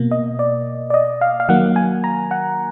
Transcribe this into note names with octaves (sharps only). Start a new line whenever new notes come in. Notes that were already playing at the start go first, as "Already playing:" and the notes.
Already playing: B2 A#3
D#5
D5
D5
D#5
F5
F5
D#3 F#3 A#3 F#5
G#5
A#5
F#5